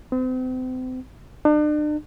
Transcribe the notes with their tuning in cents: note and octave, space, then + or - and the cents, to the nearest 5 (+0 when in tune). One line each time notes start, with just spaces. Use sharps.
C4 -40
D4 +40